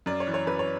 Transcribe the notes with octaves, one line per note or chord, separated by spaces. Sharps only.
F#2 D5
C#5
E3
C#5
F#2 B4
C#5